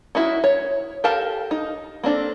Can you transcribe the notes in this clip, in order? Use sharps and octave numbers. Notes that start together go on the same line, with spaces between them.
C#4 D#4 E4 F#4
C#5
G4 A4 A#4 F5 A5
D#4
A#3 C4 D4 A4